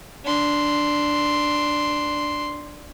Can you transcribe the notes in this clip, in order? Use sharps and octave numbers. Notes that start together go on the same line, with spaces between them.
D4 C6